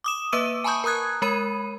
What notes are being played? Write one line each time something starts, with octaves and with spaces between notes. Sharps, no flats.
D6 D#6 E7
A#3 B4 E5 D6 E6 D#7
G#5 A5 B5 C#6 D#6 G6
A#4 A#5 D#6 F#6 G#6
G#3 A#4 B5 D#7